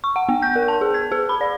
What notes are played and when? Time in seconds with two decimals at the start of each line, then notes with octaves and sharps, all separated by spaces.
0.04 C#6
0.16 F#5
0.29 B3
0.42 G6
0.56 A#4
0.68 A5
0.81 G#4
0.94 G#6
1.12 G#4
1.29 B5
1.41 D5